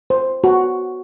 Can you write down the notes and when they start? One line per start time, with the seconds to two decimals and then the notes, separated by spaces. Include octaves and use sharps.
0.10 C5
0.44 F#4